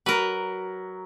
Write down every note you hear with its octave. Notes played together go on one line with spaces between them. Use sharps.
F#3 A#4 B4